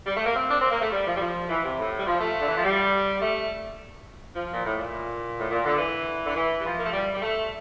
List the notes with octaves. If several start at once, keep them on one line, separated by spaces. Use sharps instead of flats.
G3
A3
A#3
C4
D4
C4
A#3
A3
G3
F3
G3
F3
E3
C3
A2
G3
F3
A3
D3
E3
F3
G3
A3
F3
A#2
A2
A#2
A2
A#2
D3
E3
D3
E3
G3
F3
A#3
A3
G3
G3
A3